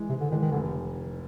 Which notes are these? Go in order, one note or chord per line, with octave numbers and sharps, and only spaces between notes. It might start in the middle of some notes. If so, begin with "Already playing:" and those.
Already playing: E3 G#3
G#2 C3
D3
D#3 E3 G#3
D#3
F1 D3